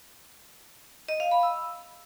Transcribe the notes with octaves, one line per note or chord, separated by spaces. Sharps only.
D#5
F5
B5
E6